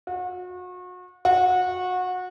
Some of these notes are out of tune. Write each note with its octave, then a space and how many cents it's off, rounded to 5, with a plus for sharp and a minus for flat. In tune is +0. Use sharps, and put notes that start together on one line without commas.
F#4 -35
F#4 -25